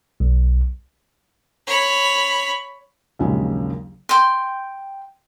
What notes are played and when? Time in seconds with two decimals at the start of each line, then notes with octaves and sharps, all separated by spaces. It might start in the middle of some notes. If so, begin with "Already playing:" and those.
0.20 B1
1.67 C#5 B5
3.19 A#1 D#2 C#3 F#3 G#3 A#3
4.09 G5 C6